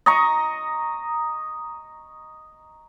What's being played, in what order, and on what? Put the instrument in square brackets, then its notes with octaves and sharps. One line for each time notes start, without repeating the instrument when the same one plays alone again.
[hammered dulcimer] D#5 A#5 C#6